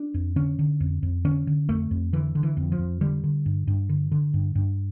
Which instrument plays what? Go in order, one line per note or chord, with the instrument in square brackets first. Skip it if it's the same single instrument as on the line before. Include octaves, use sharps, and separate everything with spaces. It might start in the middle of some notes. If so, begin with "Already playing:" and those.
Already playing: [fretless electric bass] D4
F2
D3 C#4
D3
F2
F2
D3 C#4
D3
F2 A3
F2
D3 E3
D3
E3
F2
F3
F2
D3 G3
D3
G2
G2
D3
D3
G2
G2